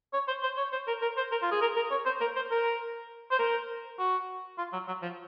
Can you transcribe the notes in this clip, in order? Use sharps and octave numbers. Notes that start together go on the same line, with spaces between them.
C#5
C5
C5
C#5
C5
A#4
A#4
C5
A#4
F4
G#4
A#4
A#4
C#5
C5
A#4
C5
A#4
C5
A#4
F#4
F4
F#3
F#3
F3